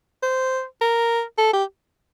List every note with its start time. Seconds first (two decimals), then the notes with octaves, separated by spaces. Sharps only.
0.23 C5
0.81 A#4
1.38 A4
1.53 G4